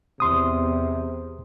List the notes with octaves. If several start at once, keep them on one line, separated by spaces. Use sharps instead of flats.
E2 C3 C6 D#6